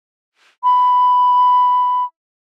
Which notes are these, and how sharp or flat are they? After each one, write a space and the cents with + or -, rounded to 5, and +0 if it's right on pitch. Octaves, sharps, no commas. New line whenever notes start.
B5 +10